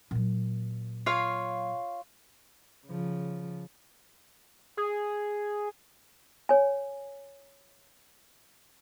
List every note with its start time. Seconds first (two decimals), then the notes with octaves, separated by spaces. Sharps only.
0.11 A#2 F#3
1.06 F4 C#5 F5
2.86 C#3 F3
4.77 G#4
6.49 C#5 G#5